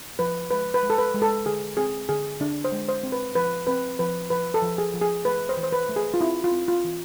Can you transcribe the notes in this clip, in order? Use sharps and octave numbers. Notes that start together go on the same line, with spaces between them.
F3 B4
G#3 B4
B4
G#3
A4
B4
G#3
A4
D3 G#4
C4 G#4
D3 G#4
D3 D4
C5
G#3
C5
C4
B4
F3 B4
C4 B4
F3 B4
F3 B4
A4
F3
G#4
F3
G#4
A3 B4
C5
E3
C5
B4
A3
G#4
F4
C4 E4
F4
C4
F4
E3